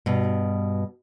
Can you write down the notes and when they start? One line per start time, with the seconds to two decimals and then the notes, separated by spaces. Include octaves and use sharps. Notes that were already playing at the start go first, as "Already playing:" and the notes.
0.06 G2 B2